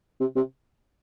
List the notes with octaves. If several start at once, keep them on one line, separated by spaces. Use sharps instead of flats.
C3
C3